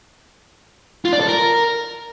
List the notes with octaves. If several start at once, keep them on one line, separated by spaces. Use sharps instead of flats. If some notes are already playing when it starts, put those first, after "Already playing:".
F4
D5
A4
A#4